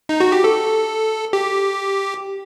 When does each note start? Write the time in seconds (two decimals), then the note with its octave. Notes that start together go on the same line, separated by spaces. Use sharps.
0.09 D#4
0.20 F#4
0.32 G4
0.44 A4
1.33 G4